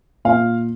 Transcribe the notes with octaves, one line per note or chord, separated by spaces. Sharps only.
A#2 F5